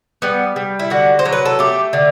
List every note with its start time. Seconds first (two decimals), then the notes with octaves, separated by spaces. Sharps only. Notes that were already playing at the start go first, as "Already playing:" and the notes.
0.22 G3 B3
0.56 G3
0.79 E4
0.90 D3 F#4
1.19 C5
1.25 F#3
1.32 B4
1.45 A4
1.59 A3 G4
1.93 D3